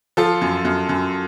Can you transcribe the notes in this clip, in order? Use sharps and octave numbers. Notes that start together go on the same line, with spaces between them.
F3 F4 A4
F#2
F#2
F#2